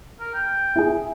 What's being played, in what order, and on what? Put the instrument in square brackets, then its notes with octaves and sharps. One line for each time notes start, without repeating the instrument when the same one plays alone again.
[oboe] A#4
G5
[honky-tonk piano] E4 G#4